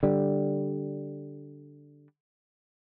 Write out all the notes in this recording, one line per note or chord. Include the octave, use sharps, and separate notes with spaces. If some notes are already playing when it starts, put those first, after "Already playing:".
D3 G3